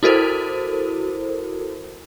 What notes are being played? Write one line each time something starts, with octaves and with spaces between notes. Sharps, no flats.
E4 F#4 A4 A#4 C5